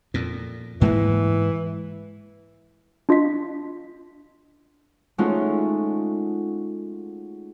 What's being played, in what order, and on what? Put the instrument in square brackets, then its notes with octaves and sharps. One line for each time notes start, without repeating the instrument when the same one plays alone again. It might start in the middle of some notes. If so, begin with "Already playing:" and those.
[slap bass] F2 A#2
[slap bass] G#2 G#3 A#3 [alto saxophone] E3
[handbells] D4 F4 D#5 B6
[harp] G#3 A3 C#4 D#4 F4 F#4